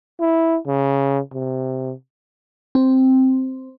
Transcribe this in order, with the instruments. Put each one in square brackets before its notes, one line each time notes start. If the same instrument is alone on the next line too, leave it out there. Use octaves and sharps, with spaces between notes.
[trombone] E4
C#3
C3
[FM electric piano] C4